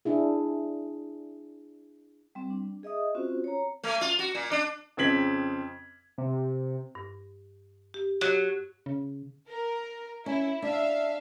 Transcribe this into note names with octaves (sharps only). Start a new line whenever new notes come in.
D4 E4 G#4
G3 C4
D4
G#4 D#5 E5 D#6
C4 C#4 F4 F#4 C5
C#5 A#5
A3
F4
F#4
A#2
D4
F2 C#3 C4 G#6 B6 F#7
C3
G2
G4
F#3 G4
C#3
A#4
C#4 E4
D4 E5 F5